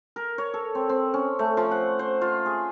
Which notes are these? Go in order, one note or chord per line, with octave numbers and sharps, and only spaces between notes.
A#4
C#5
A4
C4
C4
C#4
A3
F3
F#5
C5
F4
G#4